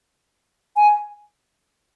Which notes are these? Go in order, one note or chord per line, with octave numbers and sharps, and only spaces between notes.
G#5